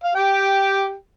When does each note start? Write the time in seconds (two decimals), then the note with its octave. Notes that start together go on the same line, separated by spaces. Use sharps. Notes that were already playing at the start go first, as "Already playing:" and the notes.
0.04 F5
0.15 G4 G5